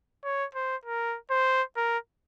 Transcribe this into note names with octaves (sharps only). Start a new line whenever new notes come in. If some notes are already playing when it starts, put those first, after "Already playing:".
C#5
C5
A#4
C5
A#4